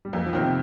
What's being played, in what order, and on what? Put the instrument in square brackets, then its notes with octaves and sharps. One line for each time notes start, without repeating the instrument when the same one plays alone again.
[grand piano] G3
[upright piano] F2 [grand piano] A#3
[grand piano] F3
[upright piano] D#3 C4
[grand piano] C3